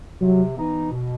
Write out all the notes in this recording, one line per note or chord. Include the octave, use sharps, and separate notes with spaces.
C3 F#3
E3 B3 D#4
B2